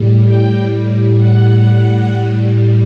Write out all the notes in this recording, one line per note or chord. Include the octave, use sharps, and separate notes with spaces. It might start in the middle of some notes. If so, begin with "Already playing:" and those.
Already playing: A2 G3
G5
F#5